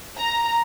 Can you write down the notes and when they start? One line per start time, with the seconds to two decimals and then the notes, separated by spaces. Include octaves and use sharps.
0.17 A#5